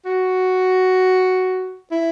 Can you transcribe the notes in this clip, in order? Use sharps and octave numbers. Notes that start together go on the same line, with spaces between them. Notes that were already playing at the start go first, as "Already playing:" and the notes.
F#4
E4